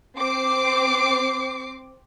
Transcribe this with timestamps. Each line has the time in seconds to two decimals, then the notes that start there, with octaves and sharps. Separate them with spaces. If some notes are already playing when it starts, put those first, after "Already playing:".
0.18 C4 D6 C7